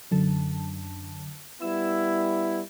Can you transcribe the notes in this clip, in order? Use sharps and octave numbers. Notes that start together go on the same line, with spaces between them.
F#2 D3 A5
G3 B3 E4 E6